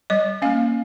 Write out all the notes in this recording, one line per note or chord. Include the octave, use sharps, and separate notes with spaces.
G3 D#5
A#3 C#4 F5